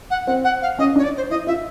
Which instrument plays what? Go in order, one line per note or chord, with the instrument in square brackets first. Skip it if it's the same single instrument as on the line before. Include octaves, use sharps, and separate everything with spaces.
[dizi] F#5
[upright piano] C4 [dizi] F#5
[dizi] F#5
F5
[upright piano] C#4 [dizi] D#5
[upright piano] D4
[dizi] C#5
D5
C5
[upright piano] E4 [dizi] D#5
[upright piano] F4 [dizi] E5